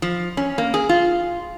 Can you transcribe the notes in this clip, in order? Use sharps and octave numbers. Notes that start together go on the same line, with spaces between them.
F3
C#4
A#3
G#4
F4